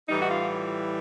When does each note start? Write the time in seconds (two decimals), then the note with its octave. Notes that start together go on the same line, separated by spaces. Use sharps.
0.08 A2 E3 G3 D#4
0.21 F#4
0.29 F4